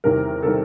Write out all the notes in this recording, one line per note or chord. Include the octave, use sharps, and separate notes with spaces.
E2 C3 D#3 G3 A#4
C3 D#3 G3 A4